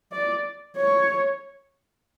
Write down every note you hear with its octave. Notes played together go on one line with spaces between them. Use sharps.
D5
C#5